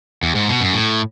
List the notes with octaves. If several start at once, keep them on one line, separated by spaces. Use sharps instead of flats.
E2
G#2
B2
F#2
A2